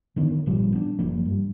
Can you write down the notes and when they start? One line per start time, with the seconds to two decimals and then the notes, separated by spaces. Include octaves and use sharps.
0.16 D3 D#3 B3
0.46 G1 A#2 F3 G3
0.72 B3 D4
0.99 F#1 F3 A#3
1.25 G2